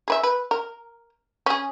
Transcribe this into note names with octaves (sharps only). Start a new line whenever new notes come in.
G#4 B4 E5
B4
A#4
C#4 G#4